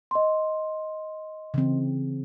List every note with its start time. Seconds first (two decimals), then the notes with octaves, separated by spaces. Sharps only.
0.11 D#5 C6
1.54 C#3 E3 C4